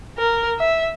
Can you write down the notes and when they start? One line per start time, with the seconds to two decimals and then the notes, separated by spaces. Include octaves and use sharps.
0.18 A#4
0.60 E5